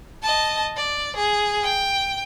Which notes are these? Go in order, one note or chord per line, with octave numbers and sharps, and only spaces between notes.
D#5 A5
D5
G#4
G5